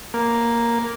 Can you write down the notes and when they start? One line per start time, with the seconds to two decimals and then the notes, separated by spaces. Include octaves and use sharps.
0.14 A#3